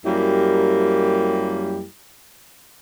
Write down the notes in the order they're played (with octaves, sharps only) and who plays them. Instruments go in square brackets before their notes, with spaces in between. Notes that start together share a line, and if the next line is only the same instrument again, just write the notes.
[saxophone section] F#2 G3 A#3 E4 G4